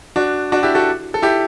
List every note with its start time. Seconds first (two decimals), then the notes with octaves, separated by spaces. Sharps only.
0.16 D4 F#4
0.52 D4 F#4
0.63 E4 G4
0.75 F#4 A4
1.14 A4
1.22 E4 G4